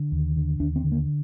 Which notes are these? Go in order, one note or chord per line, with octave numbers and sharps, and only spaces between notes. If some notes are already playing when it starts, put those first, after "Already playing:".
Already playing: D3
D#2
D3
D#2 D4
C4
D3
A#3